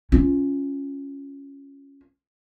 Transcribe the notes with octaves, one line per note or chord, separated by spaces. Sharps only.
C#4 F4